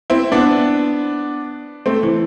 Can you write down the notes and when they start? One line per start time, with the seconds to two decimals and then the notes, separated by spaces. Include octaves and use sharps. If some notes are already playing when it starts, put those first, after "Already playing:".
0.10 C4 E4
0.32 B3 D4
1.86 A3 C4
2.03 E3